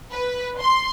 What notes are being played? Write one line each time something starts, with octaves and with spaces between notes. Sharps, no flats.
B4
C6